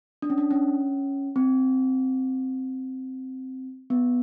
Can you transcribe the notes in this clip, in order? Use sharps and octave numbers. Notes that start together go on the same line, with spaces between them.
D4
C#4
D4
C#4
C4
B3